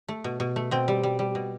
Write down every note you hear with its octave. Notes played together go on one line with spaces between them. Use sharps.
A3
B2
B2
A3
B2 C4
G3
G3
G3
B2